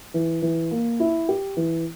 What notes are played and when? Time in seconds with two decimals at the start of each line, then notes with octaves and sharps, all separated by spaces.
0.14 E3
0.42 E3
0.71 A#3
1.00 E4
1.29 G4
1.57 E3